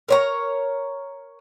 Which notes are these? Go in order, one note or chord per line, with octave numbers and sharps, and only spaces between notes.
A#4 C#5 A#5